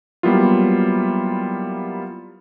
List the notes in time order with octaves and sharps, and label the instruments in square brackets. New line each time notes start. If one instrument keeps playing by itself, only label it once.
[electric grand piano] F#3 G3 A#3 B3 E4 F4